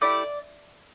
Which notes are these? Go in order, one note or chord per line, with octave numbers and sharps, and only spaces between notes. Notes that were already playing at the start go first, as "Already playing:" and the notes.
A3 E4 G4 D5